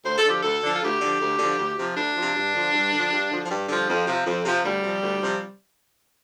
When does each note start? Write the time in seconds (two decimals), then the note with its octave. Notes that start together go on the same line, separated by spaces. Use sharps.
0.05 D2 C5
0.18 A4
0.25 D3 F3 G4
0.42 D2 A4
0.63 D3 F3 D4
0.73 F4
0.82 D2 G4
1.02 D3 F3
1.21 D2
1.39 D3 F3
1.58 D2
1.78 C3 F3
1.96 D2 D4
2.16 C3 F3
2.35 G2
2.55 D3 F3
2.73 G2
2.92 D3 F3
3.12 G2
3.30 D3 F3
3.44 F3
3.50 G2 G3
3.68 D3 F3
3.88 F2 F3
4.06 C3 F3
4.25 F2
4.45 C3 F3
4.64 D2 G3
4.83 C3 F3
5.02 D2
5.21 C3 F3